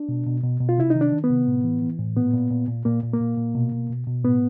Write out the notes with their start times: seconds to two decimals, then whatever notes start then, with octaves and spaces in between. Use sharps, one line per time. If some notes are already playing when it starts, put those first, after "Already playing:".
Already playing: D4
0.09 B2
0.27 B2
0.44 B2
0.60 B2
0.69 F4
0.78 C3 E4
0.90 D#3 D#4
1.01 D4
1.12 D#3
1.24 B3
1.30 C3
1.47 A2
1.64 E3
1.82 E3
1.99 A2
2.16 A#2 B3
2.34 A#2
2.51 A#2
2.68 A#2
2.85 A#2 A#3
3.03 A#2
3.13 A#3
3.20 A#2
3.38 A#2
3.55 B2
3.72 B2
3.90 B2
4.07 B2
4.24 A2 B3